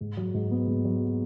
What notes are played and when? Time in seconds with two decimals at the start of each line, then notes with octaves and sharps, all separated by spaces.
0.01 G#2
0.17 F#3
0.34 G#2
0.51 B3
0.67 G#2
0.85 F#3